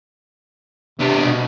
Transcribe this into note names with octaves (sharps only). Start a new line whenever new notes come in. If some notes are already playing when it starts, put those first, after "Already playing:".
C3 B3 D4
B2